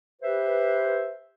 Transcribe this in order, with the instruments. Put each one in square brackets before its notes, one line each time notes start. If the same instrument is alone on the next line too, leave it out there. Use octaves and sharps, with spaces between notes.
[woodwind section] G4 B4 C5 E5